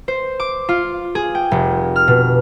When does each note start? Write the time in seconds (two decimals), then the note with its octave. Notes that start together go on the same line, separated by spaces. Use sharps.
0.08 C5
0.40 D6
0.69 F4
1.15 G#4
1.35 G5
1.51 F1
1.96 F6
2.08 B2